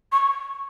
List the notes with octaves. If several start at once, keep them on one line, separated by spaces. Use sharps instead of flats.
C#6